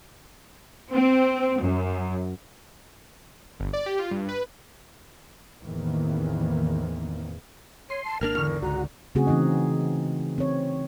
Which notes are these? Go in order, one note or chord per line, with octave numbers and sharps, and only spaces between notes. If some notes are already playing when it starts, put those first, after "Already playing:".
C4
F#2
G1
D5
G4
F4
G2
B4
A1 E2 D#3 E3 A#3 C4
C#5 C6 D#7
A5
G#1 A#3 D4 A#4 F6
G#1 E2 D3 C#6
C#2 F#4 A#5
C#3 A3 C4 F#4 G#4
E3 C4 D#4 D#5
C4 C#5